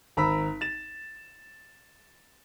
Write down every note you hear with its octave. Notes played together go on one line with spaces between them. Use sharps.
G#1 A#5 B5 E6 B6
A6 E7